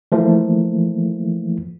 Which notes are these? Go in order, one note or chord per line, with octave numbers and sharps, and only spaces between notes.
E3 F3 A3 A#3